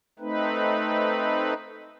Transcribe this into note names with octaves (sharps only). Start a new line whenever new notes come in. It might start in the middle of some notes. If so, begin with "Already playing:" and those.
A3 C4 D#4 B4